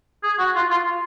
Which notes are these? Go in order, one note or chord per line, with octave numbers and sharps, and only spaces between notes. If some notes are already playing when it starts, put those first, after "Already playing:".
G#4
F#4
F4
F4